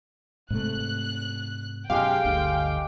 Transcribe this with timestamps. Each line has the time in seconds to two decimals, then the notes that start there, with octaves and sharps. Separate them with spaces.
0.50 G#2 C3 A3 F#6
1.90 F#2 B2 G#3 G4 F5 G5
2.25 G1 D2 D3